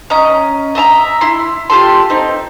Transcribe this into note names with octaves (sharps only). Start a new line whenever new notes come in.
C#4 D#5 A#5
D#5 E5 A5 A#5
E4 C6
F4 G4 A4 C6
C4 D#4